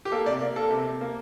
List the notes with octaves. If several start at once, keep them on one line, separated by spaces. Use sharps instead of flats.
G4
A#3 A4
C3 D5
A#3
A#3 A4
C3
C3
A#3